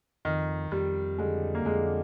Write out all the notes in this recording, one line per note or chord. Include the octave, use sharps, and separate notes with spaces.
F2 D#3
F2 G3
D3 G#3
A#3
F2 G#3